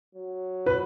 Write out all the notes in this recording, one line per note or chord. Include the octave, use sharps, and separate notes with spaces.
F#3
B4